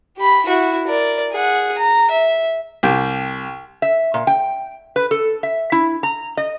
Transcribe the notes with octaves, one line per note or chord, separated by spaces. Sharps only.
G4 B5
E4 F#4
A#4 D5
G#4 F#5
A#5
E5
C2 G4 G5
E5
A#2
G5
B4
A4
E5
E4
A#5
D#5